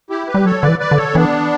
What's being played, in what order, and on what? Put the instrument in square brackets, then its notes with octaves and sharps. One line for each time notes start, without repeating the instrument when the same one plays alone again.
[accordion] E4 G4
G4 B4
[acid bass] G3
[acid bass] F#3 [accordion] A4 C#5
[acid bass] D3 [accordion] B4 D5
[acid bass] E3
[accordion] B4 D5
[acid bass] D3
[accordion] A4 C#5
[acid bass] E3 [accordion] B3 D4